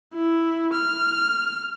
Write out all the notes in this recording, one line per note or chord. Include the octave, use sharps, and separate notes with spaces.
E4
F6